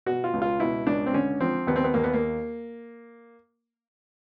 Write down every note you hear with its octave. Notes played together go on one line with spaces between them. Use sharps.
B2 F#4
F4
C#2
F4
B2 E4
C#2 D4
C4
D3 C#4
F3 C4
D#2 B3
C4
B3
D#2 A#3
B3
A#3